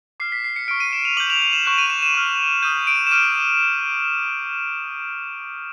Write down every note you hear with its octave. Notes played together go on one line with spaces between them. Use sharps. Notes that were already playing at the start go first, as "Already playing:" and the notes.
D6 F6 C7
B6
C7
C#7
C#6 F6 D7
D#7
E7
F7
D6 G6 F#7
F7
F7
E7
C#6 F#6 E7
D#7
F7
E7
E7
C#6 F6
D#6 G6 D#7
D7
E7
D6 F6 D#7